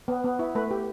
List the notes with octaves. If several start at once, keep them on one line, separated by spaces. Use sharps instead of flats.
B3
B3
E4
A3 B4
G4